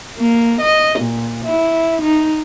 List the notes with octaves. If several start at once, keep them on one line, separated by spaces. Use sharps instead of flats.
A#3
D#5
A#2
E4
D#4